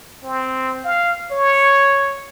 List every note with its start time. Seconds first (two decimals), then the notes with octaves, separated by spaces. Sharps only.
0.23 C4
0.84 F5
1.31 C#5